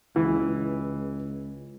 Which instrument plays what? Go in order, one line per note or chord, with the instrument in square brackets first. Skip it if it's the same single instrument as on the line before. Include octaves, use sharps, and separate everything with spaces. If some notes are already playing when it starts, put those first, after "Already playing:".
[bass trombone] C#2 [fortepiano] E3